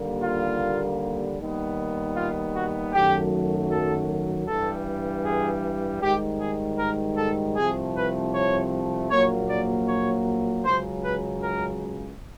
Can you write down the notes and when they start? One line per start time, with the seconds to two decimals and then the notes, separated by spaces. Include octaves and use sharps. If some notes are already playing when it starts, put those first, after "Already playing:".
Already playing: D#2 D3 G3 A#3
0.23 F4
1.38 D#2 D#3 G3 B3
2.16 F4
2.55 F#4
2.93 F#2 D#3 F#3 A3 G4
3.70 A4
4.47 G2 E3 G3 A4
5.25 G#4
6.02 G#2 D#3 G3 G4
6.40 G#4
6.78 A#4
7.17 A4
7.56 C2 C3 F3 A3 G#4
7.95 B4
8.33 C#5
9.10 A#1 A#2 F#3 A#3 C#5
9.49 D5
9.88 C#5
10.65 C#2 C#3 F#3 C5
11.04 B4
11.42 A#4